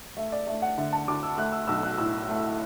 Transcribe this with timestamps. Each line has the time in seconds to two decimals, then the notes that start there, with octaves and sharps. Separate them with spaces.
0.17 A3 E5
0.32 D5
0.47 A3 E5
0.62 F#5
0.77 D3 E5
0.93 A5
1.08 D2 D6
1.23 E6
1.38 A3 F#6
1.52 E6
1.67 B1 E6
1.83 F#6
1.98 A2 E6
2.28 A3